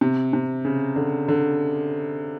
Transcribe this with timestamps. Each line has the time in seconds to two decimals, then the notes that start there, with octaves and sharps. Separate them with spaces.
0.01 C3
0.33 C3
0.65 C#3
0.96 D3
1.28 D3